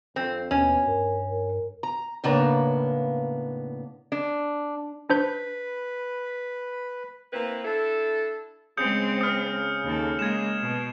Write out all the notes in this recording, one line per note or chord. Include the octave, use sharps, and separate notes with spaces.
F2 C4
D#2 B2 C#4
G2 A#4
A#4
A#5
A2 C#3 A#3 B3 D4 A#5
D4
D4 B4 C5 G6
A#3 C4 E4 B4
D4 E4 A4
C#3 G#3 C4 D#6 G6 C#7
D#6 F6
D#2 A4
G#3 A#3 G#6 E7
B2